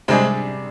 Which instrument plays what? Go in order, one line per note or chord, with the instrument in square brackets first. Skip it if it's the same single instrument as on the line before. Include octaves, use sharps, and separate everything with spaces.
[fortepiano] C3 G3 D4 G#4 [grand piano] G#3 C4